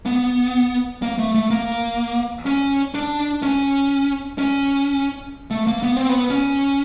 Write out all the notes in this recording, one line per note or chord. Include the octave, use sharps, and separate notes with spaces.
B3
A#3
A3
A3
A#3
C#4
D4
C#4
C#4
A3
A#3
B3
C4
B3
C#4